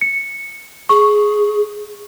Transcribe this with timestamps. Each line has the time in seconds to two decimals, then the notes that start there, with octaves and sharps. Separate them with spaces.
0.01 C#7
0.89 G#4 C#6